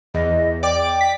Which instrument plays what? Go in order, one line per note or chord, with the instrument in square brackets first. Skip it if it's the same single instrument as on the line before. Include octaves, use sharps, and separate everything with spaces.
[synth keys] E2 [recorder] D#5
[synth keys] D5 D6 [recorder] G5
[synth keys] B6